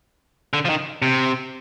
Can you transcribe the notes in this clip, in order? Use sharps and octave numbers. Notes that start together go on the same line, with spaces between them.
D3
F3
D#3
C3